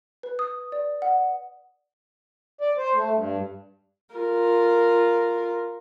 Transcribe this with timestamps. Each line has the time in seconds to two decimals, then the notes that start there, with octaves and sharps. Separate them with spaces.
0.23 B4
0.39 D#6
0.72 D5
1.02 F#5
2.61 D5
2.77 C5
2.94 A3
3.14 G2
4.15 F4 A#4